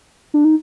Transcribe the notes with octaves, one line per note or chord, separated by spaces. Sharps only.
D4
D#4